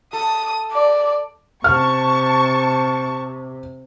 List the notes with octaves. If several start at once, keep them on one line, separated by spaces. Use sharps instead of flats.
A4 D#6
D5
C3 A5 C#6 F6